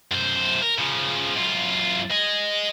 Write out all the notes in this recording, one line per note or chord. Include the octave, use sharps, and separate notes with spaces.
F#2 C5
A#4
C#3 F3
F#2 F4
D#5 G#5